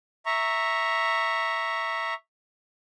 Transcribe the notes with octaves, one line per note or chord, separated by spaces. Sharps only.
E5 A#5 C#6